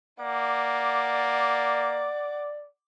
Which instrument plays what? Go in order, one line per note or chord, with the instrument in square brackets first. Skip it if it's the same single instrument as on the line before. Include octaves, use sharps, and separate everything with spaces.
[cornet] A#3 [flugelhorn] D5 [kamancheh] F#5 D6